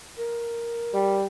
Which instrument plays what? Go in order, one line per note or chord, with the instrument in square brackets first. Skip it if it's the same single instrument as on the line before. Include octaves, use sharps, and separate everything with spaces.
[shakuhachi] A#4
[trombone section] G3